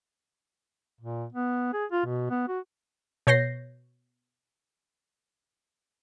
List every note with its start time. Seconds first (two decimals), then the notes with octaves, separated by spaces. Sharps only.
1.01 A#2
1.33 B3
1.73 G#4
1.91 F4
2.06 B2
2.30 B3
2.48 F#4
3.27 B2 C#5 G6 A#6 C7